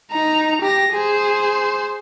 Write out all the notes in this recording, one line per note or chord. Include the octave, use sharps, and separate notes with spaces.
D#4 A#5
G4 A#6
G#4 C5